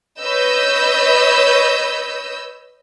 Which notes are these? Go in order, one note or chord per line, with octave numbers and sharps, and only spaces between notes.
B4 C#5 D#5 E6 G6